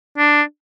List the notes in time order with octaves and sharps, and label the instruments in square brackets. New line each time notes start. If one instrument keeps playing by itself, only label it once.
[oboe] D4